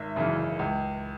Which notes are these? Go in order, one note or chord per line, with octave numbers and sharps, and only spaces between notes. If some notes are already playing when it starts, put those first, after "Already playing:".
Already playing: G#1 E5
F#2 C#3 E3
C#2